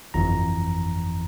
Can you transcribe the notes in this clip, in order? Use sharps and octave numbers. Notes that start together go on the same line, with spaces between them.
G1 F2 E3 A#5